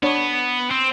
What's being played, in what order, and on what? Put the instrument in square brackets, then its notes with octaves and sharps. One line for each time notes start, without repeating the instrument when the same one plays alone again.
[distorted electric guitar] B3 [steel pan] D4 C#5
[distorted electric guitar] C4